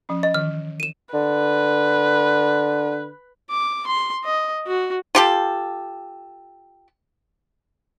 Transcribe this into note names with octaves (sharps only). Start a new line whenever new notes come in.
F3 C#4
D#5
D#3 E3 F6
D#7 E7
D3 B4
D6
C6
D#5
F#4
F4 G4 A4